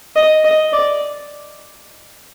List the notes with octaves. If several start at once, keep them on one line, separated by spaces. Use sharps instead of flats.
D#5
D#5
D5